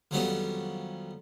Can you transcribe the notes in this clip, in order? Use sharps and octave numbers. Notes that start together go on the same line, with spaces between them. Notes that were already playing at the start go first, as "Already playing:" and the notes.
F2 D#3 F#3 G3 B3 C#4